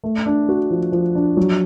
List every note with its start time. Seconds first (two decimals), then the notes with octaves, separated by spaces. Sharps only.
0.04 A3
0.26 D4
0.49 F#4
0.70 F3
0.92 F3
1.15 D4
1.37 F#3